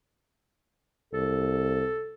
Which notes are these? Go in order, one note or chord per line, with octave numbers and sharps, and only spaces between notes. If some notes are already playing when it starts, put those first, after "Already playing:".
C2 A4